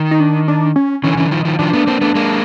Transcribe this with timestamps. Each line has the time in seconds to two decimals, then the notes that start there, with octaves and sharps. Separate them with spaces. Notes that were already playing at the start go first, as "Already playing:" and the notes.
Already playing: D#3
0.11 D#4
0.20 D4
0.48 D4
0.76 C#4
1.03 D3 E3 C#4
1.17 D3 E3
1.31 D#3 F3
1.45 D#3 F3
1.59 D#3 F3 D4
1.73 A3 B3
1.87 A#3 C4
2.01 A3 B3
2.15 G#3 A#3